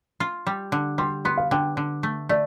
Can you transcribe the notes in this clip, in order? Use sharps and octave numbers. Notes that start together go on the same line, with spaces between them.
F4
G3
D3
G3 C6
B3 C6
F5
D3 G5
D3
A3
A3 D5